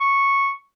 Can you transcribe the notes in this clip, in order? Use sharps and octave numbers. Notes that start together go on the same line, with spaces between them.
C#6